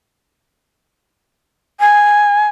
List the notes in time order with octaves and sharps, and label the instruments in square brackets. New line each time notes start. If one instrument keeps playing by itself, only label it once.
[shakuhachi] G#5